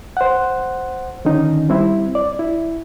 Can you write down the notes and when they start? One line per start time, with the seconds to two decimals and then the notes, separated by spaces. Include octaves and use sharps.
0.17 C5 F#5
1.25 D3 D#3 C#4 D#4
1.69 G3 C4 E4
2.15 D5
2.39 E4